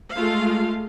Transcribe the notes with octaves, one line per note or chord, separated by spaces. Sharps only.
G#3 A3 F4 F5